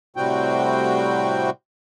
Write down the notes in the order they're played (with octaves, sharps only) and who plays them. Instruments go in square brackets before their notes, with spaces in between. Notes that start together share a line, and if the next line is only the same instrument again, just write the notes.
[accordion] A2 C3 G3 C4 F#4 G5